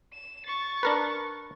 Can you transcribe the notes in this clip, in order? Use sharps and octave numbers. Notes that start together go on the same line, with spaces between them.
E7
C#6 A6
D4 A#4 B4